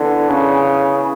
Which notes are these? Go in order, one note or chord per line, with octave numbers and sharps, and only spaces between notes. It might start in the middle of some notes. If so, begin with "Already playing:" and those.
Already playing: D3 E3 B3
C#3